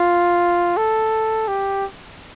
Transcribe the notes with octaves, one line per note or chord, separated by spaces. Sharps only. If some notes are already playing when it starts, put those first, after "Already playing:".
Already playing: F4
A4
G4